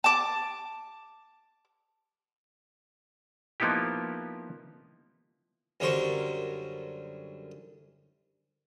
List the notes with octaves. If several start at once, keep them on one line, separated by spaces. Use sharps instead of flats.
A5 D6
F3 A#3 B3 D#4 E4 G4
F#2 D3 G3 A#4 C5 C#6